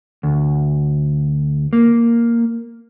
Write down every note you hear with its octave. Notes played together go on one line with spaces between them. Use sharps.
D2
A#3